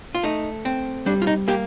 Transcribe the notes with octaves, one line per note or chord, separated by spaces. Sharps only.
F4
A3 D#4
C4
G3 D4
F4
D#4
A#3 G4